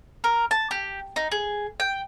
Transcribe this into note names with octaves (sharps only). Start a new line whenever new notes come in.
A#4
A5
G4
D#4
G#4
G5